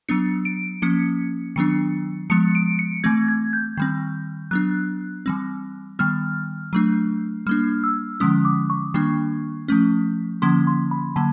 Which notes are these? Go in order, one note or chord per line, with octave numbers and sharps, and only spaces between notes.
F#3 B3 D4 C#7
D7
F3 A#3 C#4 C#7
D#3 F#3 B3 D4 C#7
F3 G#3 B3 C#7
D7
C#7
E3 A3 C4 G#6
G#6
G6
D#3 G3 C4
F#3 B3 D4 F#6
E3 G3 C4
D#3 G3 B3 F6
F#3 A3 D4
G3 A#3 D4 F6
E6
D3 F3 G#3 C#4 D#6
D6
C#6
D#3 G3 A#3 D4
F3 A3 C#4
D3 F3 A#3 C#4 C6
C6
B5
D3 F#3 A#3 A5